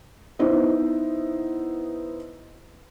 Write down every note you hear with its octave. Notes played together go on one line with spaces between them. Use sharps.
B3 D#4 E4 C5